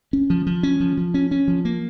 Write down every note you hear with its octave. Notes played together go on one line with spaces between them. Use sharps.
C#4
F3
F3
C#4
F3
F3
C#4
C#4
F3
A#3